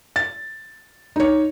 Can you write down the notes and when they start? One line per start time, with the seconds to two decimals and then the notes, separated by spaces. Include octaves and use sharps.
0.16 A6
1.16 D#4 C#5